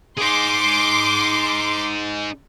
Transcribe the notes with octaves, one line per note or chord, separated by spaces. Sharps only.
D#4 G#4 C6 D6